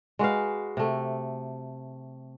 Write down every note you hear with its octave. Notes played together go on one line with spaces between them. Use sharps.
G#3 F#4 B4 F5
C3 A3